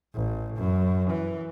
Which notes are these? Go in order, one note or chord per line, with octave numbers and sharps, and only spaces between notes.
A1
F#2
E3